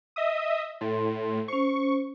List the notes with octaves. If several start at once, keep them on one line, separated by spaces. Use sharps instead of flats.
D#5 E5 D#6
A2 A4 C6
C#4 C5 C#6